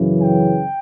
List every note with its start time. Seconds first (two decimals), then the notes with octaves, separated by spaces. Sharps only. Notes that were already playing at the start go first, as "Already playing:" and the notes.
Already playing: F#2 C#3 E3
0.20 G5